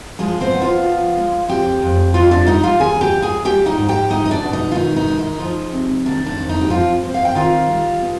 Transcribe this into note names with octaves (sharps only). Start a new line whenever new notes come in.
F3 G#3 G#4
C4 C5
B3
F4 F5
F3
G#3
F2 G4 G5
F2
G3 F4 F5
D4 D5
G3 D#4 D#5
F4 F5
D#2 G#4 G#5
G4 G5
D#2
G#4 G#5
G3 G4 G5
D#4 D#5
G#2
G4 G5
G#3 D#4 D#5
D#5
D4 D5
B2
D#4
F4
D#3 D#4
D#4
G#3
D#4
F3
C3
D#3 D4
D4
F2
D#4
G4
F3 C4 F4
C4
F5
G5
D#3 F4 F5
G3
B2